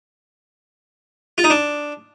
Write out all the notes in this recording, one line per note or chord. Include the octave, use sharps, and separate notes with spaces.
F4
D#4
D4